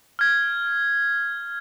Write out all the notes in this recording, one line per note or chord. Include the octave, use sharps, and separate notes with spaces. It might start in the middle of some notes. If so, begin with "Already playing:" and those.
F6 G#6